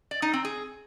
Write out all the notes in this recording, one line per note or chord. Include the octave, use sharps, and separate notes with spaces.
D5
D#4
C4
G#4